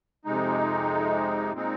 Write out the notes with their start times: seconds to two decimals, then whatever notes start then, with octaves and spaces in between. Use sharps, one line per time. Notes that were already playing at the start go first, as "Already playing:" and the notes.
0.25 F2 C3 G#3 D#4
1.52 A#2 G#3 C4 D#4